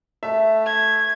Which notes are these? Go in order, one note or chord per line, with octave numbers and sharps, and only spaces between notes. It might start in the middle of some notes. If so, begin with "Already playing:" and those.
A3 E5
G#6